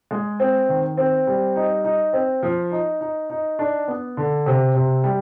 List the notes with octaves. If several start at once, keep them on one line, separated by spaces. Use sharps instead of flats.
G#3
C4
D#3
C4
G3
D#4
D#4
C4
F3
D#4
D#4
D#4
D4
B3
D3
C3
C3
G3